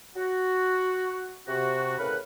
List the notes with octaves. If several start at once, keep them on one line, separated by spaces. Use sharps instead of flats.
F#4
C3 F#4
A2 C#3 A#4 B4 F#5 B5